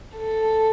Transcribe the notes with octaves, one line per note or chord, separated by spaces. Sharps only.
A4